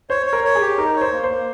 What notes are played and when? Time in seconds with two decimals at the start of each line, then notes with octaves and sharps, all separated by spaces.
0.10 C5 C#5
0.26 C#5
0.33 A#4
0.45 C#5
0.55 G#4
0.61 G4
0.78 D#4 A#4
0.96 C#5
1.01 C5
1.13 A#3
1.24 C5
1.30 A#3